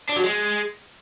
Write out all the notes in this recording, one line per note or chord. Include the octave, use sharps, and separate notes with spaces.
D4
F#3
G#3